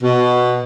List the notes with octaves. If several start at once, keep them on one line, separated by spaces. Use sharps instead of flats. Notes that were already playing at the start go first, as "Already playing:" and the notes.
B2